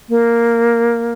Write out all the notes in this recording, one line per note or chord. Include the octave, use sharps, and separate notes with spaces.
A#3